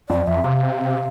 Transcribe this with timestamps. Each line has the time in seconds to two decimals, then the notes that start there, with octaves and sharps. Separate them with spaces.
0.09 F2 D5
0.27 F2 E5
0.44 C3 F5